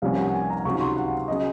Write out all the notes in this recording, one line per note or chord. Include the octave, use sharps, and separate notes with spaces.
C2 C3 F3 A#3 C#4 F5
F#5
G#5
A#5
C#2 C3 D#3 F#3 C#6
C6
F#5
C#3 F#3 C#4 D#5